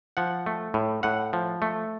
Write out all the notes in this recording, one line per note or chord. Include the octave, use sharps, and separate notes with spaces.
F3 F#5
A3
A2
A2 F#5
F3
A3